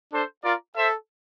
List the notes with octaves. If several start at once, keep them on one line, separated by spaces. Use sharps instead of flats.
D4 A4 C5
F4 A#4 D5
A4 C5 E5